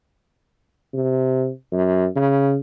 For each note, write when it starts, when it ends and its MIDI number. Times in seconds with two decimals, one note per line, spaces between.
0.94 1.50 48
1.72 2.06 42
2.16 2.57 49